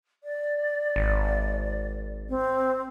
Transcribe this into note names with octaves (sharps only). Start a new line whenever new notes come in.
D5
G#1
C4